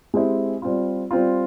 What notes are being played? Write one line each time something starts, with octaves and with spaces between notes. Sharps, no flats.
G#3 C4 E4 G4
G3 C4 F4
G3 C4 F4